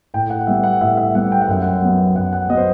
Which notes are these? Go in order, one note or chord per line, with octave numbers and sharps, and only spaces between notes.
A2 G5
F#5
F#5
G3 B3 E5
F#5
A2 E5
E5
G3 B3 F#5
G5
F#5
F#2 E5
F#5
F#3 B3
F#2 F#5
F#5
F#3 B3 D#5
C5